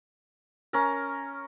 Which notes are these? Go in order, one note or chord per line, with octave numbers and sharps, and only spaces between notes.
C#4 A#4